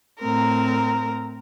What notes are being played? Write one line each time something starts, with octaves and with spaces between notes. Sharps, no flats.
A2 C4 A#4 A#5